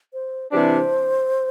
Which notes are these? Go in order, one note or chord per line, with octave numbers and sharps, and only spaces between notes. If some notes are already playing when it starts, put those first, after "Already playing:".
C5
C3 E3 G3 D4 C5